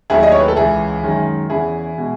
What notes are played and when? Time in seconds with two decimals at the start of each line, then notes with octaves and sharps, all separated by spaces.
0.10 D#2 D#3 F#3 A3 E4 G#4
0.23 D#5
0.31 C#5
0.40 B4
0.48 A4
0.56 C#2 C#3 E3 E4 G#4
1.03 F#2 D#3 G#3
1.50 E2 C#3 E3 E4 G#4
1.98 B2 G#3